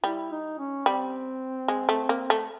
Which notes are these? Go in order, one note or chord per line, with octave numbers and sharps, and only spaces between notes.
G3 E4
D#4
C#4
G3 C4
G#3
A3
A#3
A3